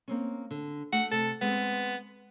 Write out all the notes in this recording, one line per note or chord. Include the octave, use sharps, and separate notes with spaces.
A#3 C4 C#4
D3
A3 F#5
C3 A4
G#3 B3 C4